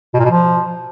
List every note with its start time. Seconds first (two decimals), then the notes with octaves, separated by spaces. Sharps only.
0.14 B2
0.19 A#2
0.25 B2
0.30 F3